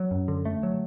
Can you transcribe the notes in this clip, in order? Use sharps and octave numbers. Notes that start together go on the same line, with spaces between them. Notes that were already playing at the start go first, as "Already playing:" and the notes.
Already playing: F#3
F#2
D3
A3
F#3